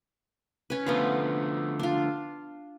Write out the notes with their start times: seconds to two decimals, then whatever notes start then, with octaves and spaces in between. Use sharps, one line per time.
0.70 C#4 B4
0.86 D3 F3 A3 B3 F4 B4
1.80 D4 F4